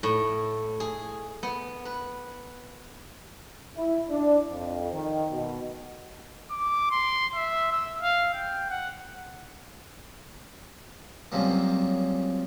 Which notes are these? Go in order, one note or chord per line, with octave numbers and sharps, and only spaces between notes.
A2
G#4
B3
B4
E4
D4
F2
D#3
B2
D6
C6
E5
E6
F5
G5
F#5
C2 F#2 C3 F3 A#3